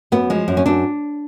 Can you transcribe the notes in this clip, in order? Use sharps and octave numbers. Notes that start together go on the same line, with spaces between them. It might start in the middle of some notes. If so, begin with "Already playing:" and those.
F#2 B3
F3 G#3
F#2
C#4
F#2 D4